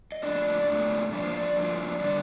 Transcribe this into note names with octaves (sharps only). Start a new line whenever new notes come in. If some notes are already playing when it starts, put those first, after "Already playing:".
D#5
A#2 A3 D4 D5
A#2 A3 D4
G2 F3 A#3 D4 D5
C5
D5
G2 F3 A#3 D4
D3 G3 D5